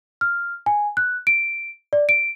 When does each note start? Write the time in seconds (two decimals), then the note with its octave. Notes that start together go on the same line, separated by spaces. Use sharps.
0.21 F6
0.66 G#5
0.97 F#6
1.27 D7
1.93 D5
2.09 D7